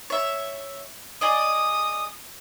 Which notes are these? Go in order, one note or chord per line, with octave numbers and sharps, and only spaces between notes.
C#5 E5
G#4 D5 D#5 D#6